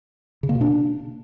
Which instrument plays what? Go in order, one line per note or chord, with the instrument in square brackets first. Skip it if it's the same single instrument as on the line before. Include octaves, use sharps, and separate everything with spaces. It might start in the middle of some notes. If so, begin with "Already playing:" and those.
[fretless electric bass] C#3
A#3
B2
D4